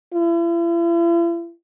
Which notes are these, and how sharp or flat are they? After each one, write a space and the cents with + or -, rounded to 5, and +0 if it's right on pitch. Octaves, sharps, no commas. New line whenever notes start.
E4 +45